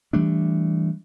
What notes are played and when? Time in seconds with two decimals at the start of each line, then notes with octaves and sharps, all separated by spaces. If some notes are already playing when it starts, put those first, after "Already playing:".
0.13 E3 G3 A3 D4